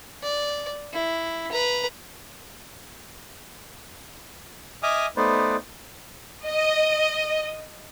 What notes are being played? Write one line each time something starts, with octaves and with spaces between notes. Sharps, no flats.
D5
E4
B4 A#5
D#5 E5 G#5 D6 D#6 F6
A3 B3 D#4 B4 C5 D5
D#5